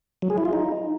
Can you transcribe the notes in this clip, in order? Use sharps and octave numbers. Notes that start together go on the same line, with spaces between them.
F#3
G#4
E4
F4
D#4